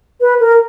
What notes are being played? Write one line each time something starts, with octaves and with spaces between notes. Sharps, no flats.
B4
A#4